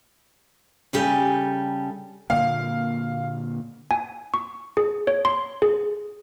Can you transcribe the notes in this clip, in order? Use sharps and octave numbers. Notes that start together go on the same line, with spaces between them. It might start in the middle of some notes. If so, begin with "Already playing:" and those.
C#3 G3 G4 A4 G#5
A#2 D3 A#3 F5
G#5
C#6
G#4
C#5
C6
G#4